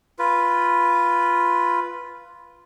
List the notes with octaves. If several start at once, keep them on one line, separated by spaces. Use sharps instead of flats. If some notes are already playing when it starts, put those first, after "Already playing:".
F4 B4